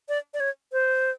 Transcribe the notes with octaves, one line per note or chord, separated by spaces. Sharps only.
D5
D5
C#5
C5